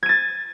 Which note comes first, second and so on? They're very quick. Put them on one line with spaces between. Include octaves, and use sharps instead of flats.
G#6 D#7 A6